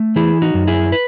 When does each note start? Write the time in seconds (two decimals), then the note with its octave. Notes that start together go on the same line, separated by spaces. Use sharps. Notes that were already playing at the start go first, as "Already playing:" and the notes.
Already playing: A3
0.16 E3 E4 G#4
0.42 D#4 F#4
0.54 F#2
0.68 E4 G#4
0.92 B4